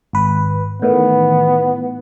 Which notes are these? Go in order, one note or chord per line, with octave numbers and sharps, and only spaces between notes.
G#1 B4
A2 D#3 E3 B3